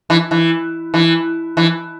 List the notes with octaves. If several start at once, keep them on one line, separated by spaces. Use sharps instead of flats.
E3
E3
E3
E3